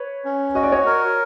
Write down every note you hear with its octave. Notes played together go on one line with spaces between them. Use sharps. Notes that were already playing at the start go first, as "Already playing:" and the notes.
Already playing: B4 C#5
C#4
F#4 D#5
D5
C#5 D#5
A#4